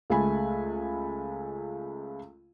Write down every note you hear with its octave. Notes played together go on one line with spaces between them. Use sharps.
C#2 G#3 A3 A4 G#5 B5